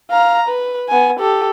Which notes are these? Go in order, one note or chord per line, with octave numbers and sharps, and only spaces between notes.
F5 A#5
B4
B3 G#5
G4 A4